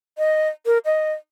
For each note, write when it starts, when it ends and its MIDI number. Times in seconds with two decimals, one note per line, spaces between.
0.18 0.49 75
0.66 0.78 70
0.85 1.12 75